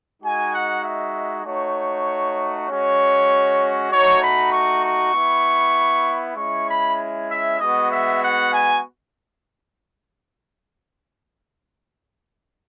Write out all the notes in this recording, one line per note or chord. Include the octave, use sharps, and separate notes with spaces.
G#3 D#4 F#4 G#5
F#5
E5
A3 D#4 F#4 C#5
G#3 C#4 F#4 C#5
A3 D#4 F#4 C#5
B5
C#6
C#6
B3 E4
G#3 C#4 E4 C#6
B5
E5
G#3 B3 F#4 D#5
E5
F#5
G#5